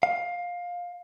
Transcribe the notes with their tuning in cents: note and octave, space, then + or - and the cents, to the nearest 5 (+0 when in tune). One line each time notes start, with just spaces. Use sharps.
F5 +15